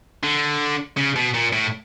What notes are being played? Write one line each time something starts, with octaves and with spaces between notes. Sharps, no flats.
D3
C#3
B2
A#2
A2